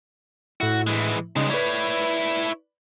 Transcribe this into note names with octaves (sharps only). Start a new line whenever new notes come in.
A2 E4 F#4
E3 G#3
G2 C#3 G#3 D#4
E4 B4 C#5 D5